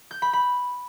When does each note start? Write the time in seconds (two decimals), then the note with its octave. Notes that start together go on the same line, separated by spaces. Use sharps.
0.11 G6
0.22 B5
0.33 B5